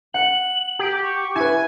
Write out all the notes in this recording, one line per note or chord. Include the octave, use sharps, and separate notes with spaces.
F#5 F#7
G4
C#6
E4 B4 G#5